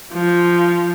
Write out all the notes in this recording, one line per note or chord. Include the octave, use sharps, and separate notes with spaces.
F3